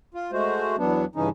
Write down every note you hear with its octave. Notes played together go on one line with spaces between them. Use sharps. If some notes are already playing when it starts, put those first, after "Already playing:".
F4
G#3 A3 F#4 C5
E2 F#3 B3 D4
G2 C#3 E3 C#4 D#4